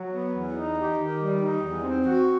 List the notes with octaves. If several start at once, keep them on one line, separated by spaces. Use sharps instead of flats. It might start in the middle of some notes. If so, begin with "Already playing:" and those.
Already playing: F#3
B3
E2
D#4
G4
D#3
G3
D#4
E2
C4
F#4